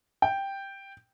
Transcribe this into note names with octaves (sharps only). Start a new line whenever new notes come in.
G5